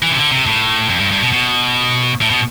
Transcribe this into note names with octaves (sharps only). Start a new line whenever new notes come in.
E3
C3
D3
C3
A2
F2
G2
G2
B2
B2
A2
B2